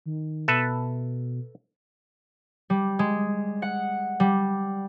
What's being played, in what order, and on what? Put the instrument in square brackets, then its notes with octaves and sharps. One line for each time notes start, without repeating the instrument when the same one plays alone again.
[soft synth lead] D#3
[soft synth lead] B2 [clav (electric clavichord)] A4 B4 E5
[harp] G3
G#3
F#5
G3